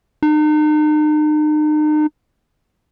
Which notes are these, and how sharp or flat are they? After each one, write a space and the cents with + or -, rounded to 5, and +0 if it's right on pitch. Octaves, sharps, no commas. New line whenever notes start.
D#4 -40